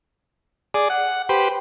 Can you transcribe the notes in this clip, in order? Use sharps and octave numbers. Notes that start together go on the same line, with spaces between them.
G#4 D5
F#5
G4 B4 C5